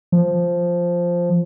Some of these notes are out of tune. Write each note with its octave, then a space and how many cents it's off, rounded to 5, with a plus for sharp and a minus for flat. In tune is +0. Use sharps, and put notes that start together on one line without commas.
F3 +0